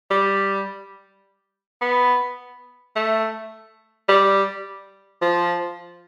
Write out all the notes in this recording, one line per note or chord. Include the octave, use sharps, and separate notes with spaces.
G3
B3
A3
G3
F3